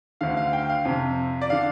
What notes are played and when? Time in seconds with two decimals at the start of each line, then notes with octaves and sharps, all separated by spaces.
0.21 D2 D3 F5
0.37 F5
0.53 G5
0.69 F5
0.85 F2 C3
1.41 D5
1.50 D3 F5